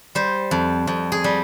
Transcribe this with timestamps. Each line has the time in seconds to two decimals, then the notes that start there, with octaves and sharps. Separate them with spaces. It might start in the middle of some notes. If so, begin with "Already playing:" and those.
0.15 G3 C5
0.51 F2
0.87 F2
1.12 G#4
1.24 G3